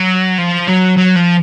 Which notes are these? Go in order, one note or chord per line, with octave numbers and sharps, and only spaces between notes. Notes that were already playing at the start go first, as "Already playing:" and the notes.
Already playing: F#3
F3
F#3
F#3
F3